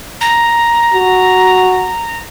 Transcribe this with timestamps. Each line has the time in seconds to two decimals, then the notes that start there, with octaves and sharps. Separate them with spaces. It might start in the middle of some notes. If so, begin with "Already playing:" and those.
0.21 A#5
0.94 F#4